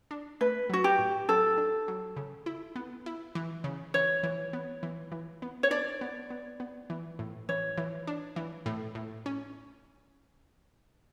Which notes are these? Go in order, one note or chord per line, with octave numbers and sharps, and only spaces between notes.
D4
A3 B4
F#3 F#4
G4
A2
F#3 A4
D4
F#3
C#3
E4
B3
E4
E3
C#3
E3 C#5
E3
B3
E3
E3
B3
C#5
D4 D5
B3
B3
B3
E3
A2
E3 C#5
E3
D4
E3
A2
A2
C#4